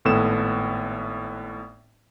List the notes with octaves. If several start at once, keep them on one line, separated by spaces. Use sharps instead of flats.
G#1 A2 B3 A4 E7